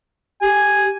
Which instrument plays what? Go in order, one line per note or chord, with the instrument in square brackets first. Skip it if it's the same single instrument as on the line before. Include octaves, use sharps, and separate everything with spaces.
[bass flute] G4 [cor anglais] G#5